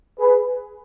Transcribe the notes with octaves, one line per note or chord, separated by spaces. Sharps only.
G#4 B4